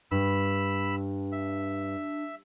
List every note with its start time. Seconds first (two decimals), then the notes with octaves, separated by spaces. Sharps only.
0.11 G2 D4 B5 E6
1.32 E5